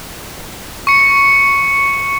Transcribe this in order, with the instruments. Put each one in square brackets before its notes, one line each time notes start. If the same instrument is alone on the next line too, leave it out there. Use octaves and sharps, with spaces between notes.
[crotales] C#6 C#7